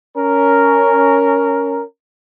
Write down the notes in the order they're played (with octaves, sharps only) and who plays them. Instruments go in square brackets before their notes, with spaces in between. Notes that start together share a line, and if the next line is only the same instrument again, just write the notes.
[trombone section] C#4 A#4